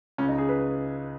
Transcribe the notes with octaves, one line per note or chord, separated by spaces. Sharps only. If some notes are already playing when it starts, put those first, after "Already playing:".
C#2 C#3 C#4
D#4
G#4
B4